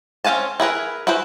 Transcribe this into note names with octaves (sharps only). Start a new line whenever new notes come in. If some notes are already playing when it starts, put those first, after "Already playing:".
C4 C#4 F5 G#5 A5
E4 G#4 A#4 B4
E4 F#4 G#4 B4 C5